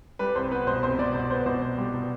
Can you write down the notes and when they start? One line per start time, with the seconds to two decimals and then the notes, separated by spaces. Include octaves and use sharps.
0.19 G3 B4
0.35 C2 C5
0.51 B3 B4
0.67 B2 C5
0.83 C2 C5
0.99 B2 D5
1.15 B2 C5
1.30 B3 C5
1.46 B2 C5
1.62 B2
1.78 G3
1.94 B2